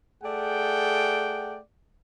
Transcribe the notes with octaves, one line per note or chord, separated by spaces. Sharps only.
A3 G#4 D5 F#5 G5